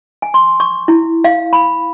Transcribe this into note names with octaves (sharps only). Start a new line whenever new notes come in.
G#5
C6
C#6
E4
F5
B5